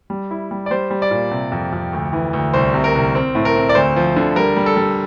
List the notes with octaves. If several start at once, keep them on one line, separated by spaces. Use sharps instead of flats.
G3
E4
G3
D5
G3 C5
G3
D5
A#2
C3
F2
F2
D2
E3
D2
C2 C5
C3
A#4
C2
C4
A2
A#4
C4
D5
D2 C5
F3
D3
G3 A#4
G3
A4
G3